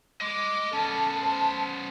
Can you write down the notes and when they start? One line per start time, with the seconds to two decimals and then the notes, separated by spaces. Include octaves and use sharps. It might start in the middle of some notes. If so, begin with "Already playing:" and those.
0.21 D#5 C6 D6
0.73 B3 C#4 A4 A5
1.18 C5